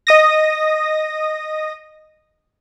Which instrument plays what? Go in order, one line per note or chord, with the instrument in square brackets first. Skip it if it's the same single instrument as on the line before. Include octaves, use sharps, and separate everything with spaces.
[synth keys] D#5 D#6 A#6